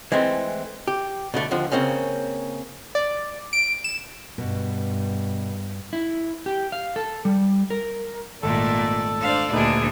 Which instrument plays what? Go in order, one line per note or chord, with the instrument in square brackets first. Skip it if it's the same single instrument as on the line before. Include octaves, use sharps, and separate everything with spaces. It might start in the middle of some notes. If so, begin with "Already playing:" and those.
[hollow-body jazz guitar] E3 G#3 A3 C4
G4
B2 D3 A3
D#2 D3 F3
C#3 A#3 C4 C#4
[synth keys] D5
D7
E7
[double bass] G2 [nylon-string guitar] B2
[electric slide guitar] E4
G4
F5
A4
G3
A#4
[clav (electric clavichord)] G#1 [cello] A#2 [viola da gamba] A3 D5 [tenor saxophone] A4
[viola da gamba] D4 C5 D5 [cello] F5
[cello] D2 D4 [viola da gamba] A#2 G#4 [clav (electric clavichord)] A3 D#4 B4